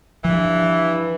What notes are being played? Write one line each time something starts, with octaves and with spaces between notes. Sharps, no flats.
G2 E3 F3